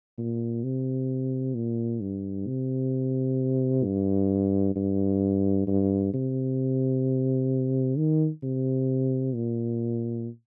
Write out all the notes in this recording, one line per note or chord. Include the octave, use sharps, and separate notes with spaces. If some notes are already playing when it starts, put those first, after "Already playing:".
A#2
C3
A#2
G2
C3
G2
G2
G2
C3
D#3
C3
A#2